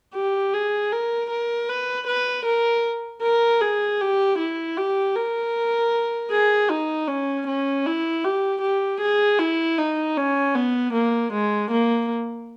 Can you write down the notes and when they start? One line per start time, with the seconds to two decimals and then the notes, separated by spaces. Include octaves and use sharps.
0.15 G4
0.54 G#4
0.92 A#4
1.30 A#4
1.69 B4
2.07 B4
2.45 A#4
3.22 A#4
3.61 G#4
4.01 G4
4.38 E4
4.77 G4
5.16 A#4
6.32 G#4
6.70 D#4
7.08 C#4
7.47 C#4
7.86 E4
8.25 G4
8.62 G4
9.01 G#4
9.39 E4
9.78 D#4
10.17 C#4
10.55 B3
10.93 A#3
11.33 G#3
11.71 A#3